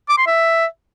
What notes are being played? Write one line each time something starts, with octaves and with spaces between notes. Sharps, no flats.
D6
C6
E5